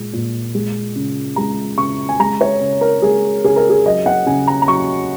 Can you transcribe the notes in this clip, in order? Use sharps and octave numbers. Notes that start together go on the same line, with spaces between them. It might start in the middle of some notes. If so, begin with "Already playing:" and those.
Already playing: A#2 G#3
A#2
G#3
C#3
G#3 A#5
C#3 C#6
G#5
G#3 A#5
C#5
C#3
A#4
G#3 G#4
C#3 G#4
A#4
G#4
F#3 D#5
F#5
C#3 G#5
A#5
A#5
F#3 C#6